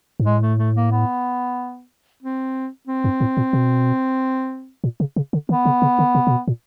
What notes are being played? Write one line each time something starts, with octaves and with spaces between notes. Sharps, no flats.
G#2
A2 G#3
A3
A3
A#3
B3
C4
C4
G2
A2
A#2
B2
A#2
C#3
C#3
D3
D#3 B3
C#3
C#3
D3
C3
C3
B2
A#2